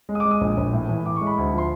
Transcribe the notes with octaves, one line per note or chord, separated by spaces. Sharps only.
G#3
D#6
D6
G#3
D#6
A#1
A#1
A2
E3
A2 D6
G#3 C#6
B5
D2
F3 C6